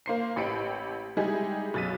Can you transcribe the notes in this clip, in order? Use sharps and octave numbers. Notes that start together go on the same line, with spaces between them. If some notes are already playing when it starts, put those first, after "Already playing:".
A#3 C5 C7
A1 G4 B5 C#7 D7
G3 G#3 D#4 E4 G4 G#4
B1 F#2 A6 B6 D#7